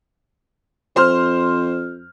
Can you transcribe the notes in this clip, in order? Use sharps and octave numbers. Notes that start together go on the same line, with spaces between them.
F2 C5 C6 F6